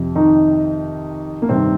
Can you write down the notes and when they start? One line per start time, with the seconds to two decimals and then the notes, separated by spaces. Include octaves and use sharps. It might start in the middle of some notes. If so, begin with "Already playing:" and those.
Already playing: F2 C3
0.15 D#3 D#4
1.42 A#3
1.49 G2 C3 D#3 C4